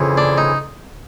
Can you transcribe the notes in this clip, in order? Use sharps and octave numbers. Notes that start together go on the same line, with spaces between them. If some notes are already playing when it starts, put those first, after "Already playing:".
Already playing: F2 C#3 E3
D4
D#4